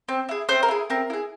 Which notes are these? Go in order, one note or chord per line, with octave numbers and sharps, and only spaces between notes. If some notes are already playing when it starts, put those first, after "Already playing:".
C4
E4 G#4
C4 C5
A#4
E4 G#4
C4 A#4
E4 G#4